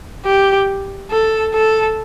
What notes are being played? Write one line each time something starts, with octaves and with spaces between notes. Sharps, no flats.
G4
A4
A4